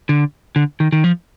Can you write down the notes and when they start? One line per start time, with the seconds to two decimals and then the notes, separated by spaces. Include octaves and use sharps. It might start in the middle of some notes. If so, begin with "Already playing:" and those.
0.09 D3
0.56 D3
0.80 D#3
0.92 D#3
1.04 F3